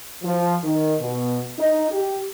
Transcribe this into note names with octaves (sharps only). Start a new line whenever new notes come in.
F3
D#3
B2
D#4
G4